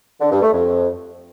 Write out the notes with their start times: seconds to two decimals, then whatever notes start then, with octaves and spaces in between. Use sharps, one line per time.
0.21 D3
0.31 G2
0.42 A3
0.53 F2